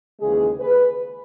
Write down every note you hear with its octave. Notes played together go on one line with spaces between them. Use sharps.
D#2 C#3 E3 G#3 G#4
B4